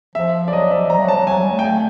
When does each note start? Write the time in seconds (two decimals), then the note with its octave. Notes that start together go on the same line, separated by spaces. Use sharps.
0.15 F3 E5
0.48 D5
0.52 F#3 D#5
0.71 F3 E5
0.90 F3 A#5
0.98 G3
1.02 F#3
1.08 A5
1.15 F#3
1.27 F#3 G#5
1.39 G3
1.51 A3
1.59 G5
1.64 G#5